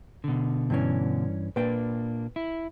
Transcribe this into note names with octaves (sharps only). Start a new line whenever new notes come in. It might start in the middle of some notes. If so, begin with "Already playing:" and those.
B2 D3
G2 E3 C#4
A#2 A#3 D4 B4 G5
E4